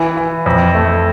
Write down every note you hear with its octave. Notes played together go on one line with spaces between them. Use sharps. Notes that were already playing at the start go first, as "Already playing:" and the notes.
Already playing: E3
E3
F2
A3